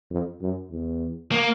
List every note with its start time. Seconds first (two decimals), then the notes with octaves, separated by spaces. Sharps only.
0.10 F2
0.41 F#2
0.71 E2
1.32 A#3